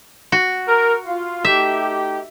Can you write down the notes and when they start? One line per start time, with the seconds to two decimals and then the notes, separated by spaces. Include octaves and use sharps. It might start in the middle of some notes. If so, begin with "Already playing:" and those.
0.32 F#4
0.67 A#4
1.06 F4
1.45 A3 D#4 G4 E5